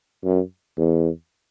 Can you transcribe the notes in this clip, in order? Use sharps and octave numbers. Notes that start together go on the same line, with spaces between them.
F#2
E2